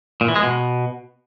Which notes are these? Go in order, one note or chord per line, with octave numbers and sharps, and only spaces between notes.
A#2
E3
G#3
B2